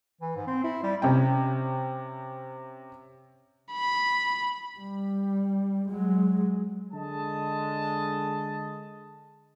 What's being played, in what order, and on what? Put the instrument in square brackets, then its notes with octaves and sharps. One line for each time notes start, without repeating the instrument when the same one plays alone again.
[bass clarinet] E3
G#2
C4
E4
G3
[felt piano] C3 C#4 G5
[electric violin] B5
[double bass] G3
F#3 G#3
[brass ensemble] D3 G#3 D#5 A5